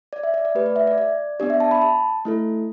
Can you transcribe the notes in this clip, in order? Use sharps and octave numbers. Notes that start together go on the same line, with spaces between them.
D5
E5
D5
D5
A3 G4 B4
D5
E5
D5
D5
B3 D4 G4 D5
E5
A5
B5
A5
A3 E4 A4